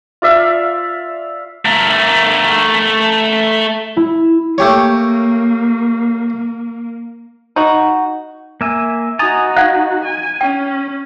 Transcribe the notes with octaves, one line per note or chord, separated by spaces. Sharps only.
F4 D5 E5 F5
A3 A#4
E4
A3 A#3 G4 C#5
D#4 F#4
A#3 E5 G#5
D#4 F#4 G#5 A#5 D#6 A6
F5 F#5 F#6 G#6
G#5
C#4 G5